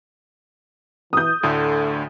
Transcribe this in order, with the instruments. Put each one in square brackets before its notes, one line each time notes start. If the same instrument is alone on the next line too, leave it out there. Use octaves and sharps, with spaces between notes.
[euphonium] E3 [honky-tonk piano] D#6 G6
[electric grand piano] D2 A2 D3 [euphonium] A4